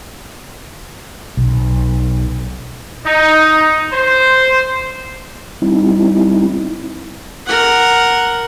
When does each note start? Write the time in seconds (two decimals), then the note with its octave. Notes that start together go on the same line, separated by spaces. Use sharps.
1.37 B1
3.05 D#4
3.92 C5
5.62 G3 C4 D#4 E4
7.46 A#4 F#5